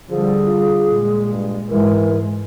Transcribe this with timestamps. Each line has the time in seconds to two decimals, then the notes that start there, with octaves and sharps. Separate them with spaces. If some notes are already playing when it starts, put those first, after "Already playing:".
0.10 D3 F3 G3 G#4
0.46 F4
0.90 A#2 G#3
1.31 G2
1.70 G#2 E3 G#3 A#4